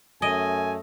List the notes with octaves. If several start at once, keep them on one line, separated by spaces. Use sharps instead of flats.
F#2 A3 D#5 G#5